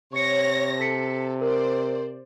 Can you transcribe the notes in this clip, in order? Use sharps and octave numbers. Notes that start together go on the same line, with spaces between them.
C3 C#5 C#6 A#6 C#7
A4 B6 C#7
A#4 C5 D5